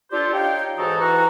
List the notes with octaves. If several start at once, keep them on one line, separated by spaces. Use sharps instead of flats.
D4 F4 G4 A4 C5 D5
D#4 C#5 F5 G5
G#2 E3 F#4 A4 D#5 A#5
E3 F#4 A#5